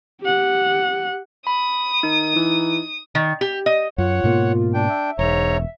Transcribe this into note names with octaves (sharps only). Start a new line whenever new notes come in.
G4 F#5
B5 D#6
D#3 D#4
E3
D#3
G4
D#5
F#2 F4 C#5 F#5
G#2 B2 A#3
D4 G5
E5
E1 G#2 C#5 A#5